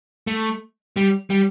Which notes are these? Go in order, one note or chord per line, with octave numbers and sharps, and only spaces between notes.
A3
G3
G3